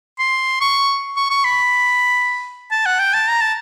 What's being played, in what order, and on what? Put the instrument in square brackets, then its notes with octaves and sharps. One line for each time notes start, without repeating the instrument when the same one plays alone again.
[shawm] C6
C#6
C#6
C#6
B5
A5
F#5
G5
A5
A#5
A5